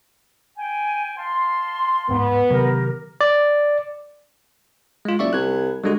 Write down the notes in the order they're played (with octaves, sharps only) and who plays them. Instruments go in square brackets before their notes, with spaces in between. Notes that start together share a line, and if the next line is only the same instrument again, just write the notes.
[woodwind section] G5 G#5
F5 A5 C6
[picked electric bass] D1 G#2 [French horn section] B3
[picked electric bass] C3 D#3 F#3 [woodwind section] G4 A#4
[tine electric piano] D5
G#3 F4
[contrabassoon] F#1 [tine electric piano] D5 E5 C#6
[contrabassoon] C2 [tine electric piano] F#6 G#6
[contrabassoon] D3 [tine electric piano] G3 G#3 F#4